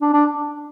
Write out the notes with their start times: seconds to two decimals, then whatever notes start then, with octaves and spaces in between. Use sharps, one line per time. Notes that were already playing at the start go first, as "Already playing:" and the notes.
0.01 D4
0.13 D4